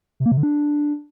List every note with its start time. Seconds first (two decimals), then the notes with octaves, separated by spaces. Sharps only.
0.20 C3
0.26 A#3
0.32 C3
0.37 D3
0.43 D4